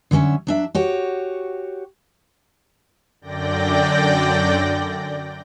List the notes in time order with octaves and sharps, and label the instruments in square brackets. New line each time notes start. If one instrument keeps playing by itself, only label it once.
[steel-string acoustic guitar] D3 F#3 G#3 C#4 E5
F#3 D4 E5
F#4 G4 C#5
[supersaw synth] F#2 D3 D5 G5 G6 A#6